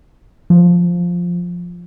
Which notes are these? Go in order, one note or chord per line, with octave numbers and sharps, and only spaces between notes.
F3